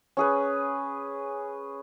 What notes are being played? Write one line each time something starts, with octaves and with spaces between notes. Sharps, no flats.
C#4 G#4 B4